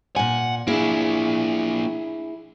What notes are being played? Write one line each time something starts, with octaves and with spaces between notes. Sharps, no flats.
A#2 F#5 G#5
A#3 D4 E4 G#4